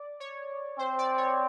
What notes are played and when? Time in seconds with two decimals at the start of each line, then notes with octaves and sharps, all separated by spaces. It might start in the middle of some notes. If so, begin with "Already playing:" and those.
Already playing: D5
0.20 C#5
0.79 C4 C5
0.99 D5
1.18 C#5